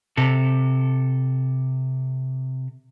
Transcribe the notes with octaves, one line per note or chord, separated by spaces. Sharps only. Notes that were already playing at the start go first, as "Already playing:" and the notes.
C3 A4